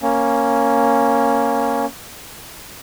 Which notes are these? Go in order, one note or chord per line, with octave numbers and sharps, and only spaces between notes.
A#3 C#4